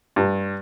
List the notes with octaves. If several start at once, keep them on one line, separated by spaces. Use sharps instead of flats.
G2